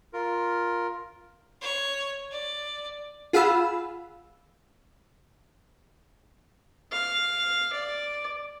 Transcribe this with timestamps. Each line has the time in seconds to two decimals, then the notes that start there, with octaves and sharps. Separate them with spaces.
0.13 F4 A#4
1.62 C#5
2.32 D5
3.33 F4 G#4 F5 F#5 B5 E6
6.92 F5
7.73 D5